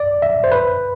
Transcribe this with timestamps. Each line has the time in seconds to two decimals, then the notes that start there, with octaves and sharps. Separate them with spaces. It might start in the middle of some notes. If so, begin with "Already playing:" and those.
Already playing: D5
0.22 E5
0.44 C5
0.52 B4